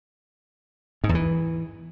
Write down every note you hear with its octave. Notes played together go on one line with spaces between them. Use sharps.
G#2
E2
E3